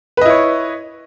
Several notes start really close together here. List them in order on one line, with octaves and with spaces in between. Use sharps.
B4 D#5 E4 C#5